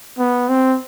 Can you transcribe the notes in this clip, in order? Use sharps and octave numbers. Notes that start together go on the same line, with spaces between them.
B3
C4